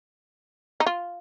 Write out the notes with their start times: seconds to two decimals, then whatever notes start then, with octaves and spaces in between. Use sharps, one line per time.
0.80 D#4
0.86 F4